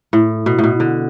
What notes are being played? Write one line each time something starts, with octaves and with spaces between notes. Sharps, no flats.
A2
B2
A2
B2
D3